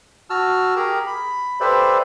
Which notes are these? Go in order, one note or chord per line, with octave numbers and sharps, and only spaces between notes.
F#4 A5 E6 F6
G4 G#4 A#4 A#5
B5
G4 A4 B4 C5 D5 E5